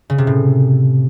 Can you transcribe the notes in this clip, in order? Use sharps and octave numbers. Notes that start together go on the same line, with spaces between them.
C#3
C3
A2